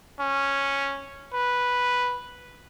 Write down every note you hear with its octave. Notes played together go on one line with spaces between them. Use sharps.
C#4
B4